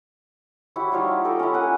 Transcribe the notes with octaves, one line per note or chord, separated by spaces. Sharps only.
E4 F#4 G4 C#5
G3 D#4 F4 C#5
G4 A4 D5 D#5
C#4 E4
A#4 F#5 G#5